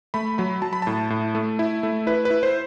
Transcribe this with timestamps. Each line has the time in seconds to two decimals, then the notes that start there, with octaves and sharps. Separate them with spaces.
0.14 A3 B5
0.38 F#3 B5
0.62 F#3 A5
0.73 B5
0.82 A2 A5
1.10 A2
1.35 A3
1.59 E4
1.83 A3
2.07 E4 B4
2.25 B4
2.30 E4
2.43 C5